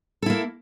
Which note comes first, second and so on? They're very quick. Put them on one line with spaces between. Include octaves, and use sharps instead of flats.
A4 E4 A#3